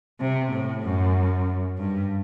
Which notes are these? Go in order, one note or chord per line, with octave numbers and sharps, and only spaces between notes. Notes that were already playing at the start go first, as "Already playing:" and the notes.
C3
A2
F#2
G2